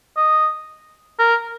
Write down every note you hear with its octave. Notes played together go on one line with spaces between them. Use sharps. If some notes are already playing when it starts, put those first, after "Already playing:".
D#5
A#4